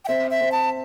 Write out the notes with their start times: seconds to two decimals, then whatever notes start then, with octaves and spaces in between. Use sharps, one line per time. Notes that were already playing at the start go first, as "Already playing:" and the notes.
0.05 G5
0.08 C4 E5
0.31 E5
0.41 C4
0.52 A5